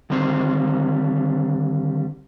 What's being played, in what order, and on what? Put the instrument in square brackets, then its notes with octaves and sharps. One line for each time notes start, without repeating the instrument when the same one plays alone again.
[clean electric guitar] D3 D#3 G3 C4 C5